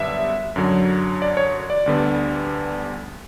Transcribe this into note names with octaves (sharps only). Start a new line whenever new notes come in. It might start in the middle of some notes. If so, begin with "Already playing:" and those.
Already playing: F#2 D3 G3 B3 E5
F#2 D3 F#3
D5
C#5
D5
D2 D3 G3 B3